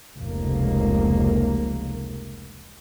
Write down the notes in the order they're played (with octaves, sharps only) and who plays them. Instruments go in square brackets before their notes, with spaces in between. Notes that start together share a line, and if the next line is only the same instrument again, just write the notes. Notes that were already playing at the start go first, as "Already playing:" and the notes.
[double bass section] F1 C#2 A#3